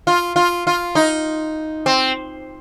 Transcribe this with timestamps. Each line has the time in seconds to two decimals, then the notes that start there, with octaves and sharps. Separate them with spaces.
0.07 F4
0.36 F4
0.67 F4
0.95 D#4
1.86 C4